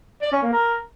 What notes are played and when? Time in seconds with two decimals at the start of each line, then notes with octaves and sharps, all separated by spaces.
0.22 D5
0.32 C#4
0.42 A#3
0.52 A#4